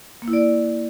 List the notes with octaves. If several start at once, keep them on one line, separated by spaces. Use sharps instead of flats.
A#3
E4
D5